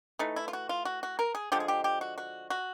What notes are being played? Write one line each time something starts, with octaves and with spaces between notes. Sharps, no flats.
E3 A3 D#4
E4
F4
F#4
F4
F#4
F#4
A#4
G#4
D3 F3 G#3 G4
G#4
G4
G4
F#4
F#4
F#4